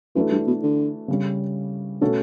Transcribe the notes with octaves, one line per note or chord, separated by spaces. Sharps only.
F#2 E3 A3 D4 F#4 A4
G2
B2
D3
C#3 G3 C#4
B2 D3 A3 C#4 F#4 A4